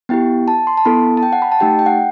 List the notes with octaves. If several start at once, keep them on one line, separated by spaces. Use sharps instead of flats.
B3 E4 G4 G5
A5
C6
A5
B3 E4 A4 B5
A5
G5
F#5
B5
A5
A3 D#4 G4 G5
G5
F#5